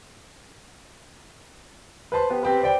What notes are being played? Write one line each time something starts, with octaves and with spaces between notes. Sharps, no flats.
B4 C5 A5 C6
B3 G4
C4 G4 B4
C5 D5 G5